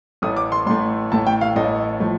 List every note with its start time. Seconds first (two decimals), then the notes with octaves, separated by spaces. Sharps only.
0.22 A1 A2 A3 D#6
0.37 D6
0.52 C6
0.66 A1 A2 A3 C6
1.12 A1 A2 A3 A5
1.27 G5
1.41 F5
1.56 A1 A2 A3 D#5
2.00 A2 F3 A3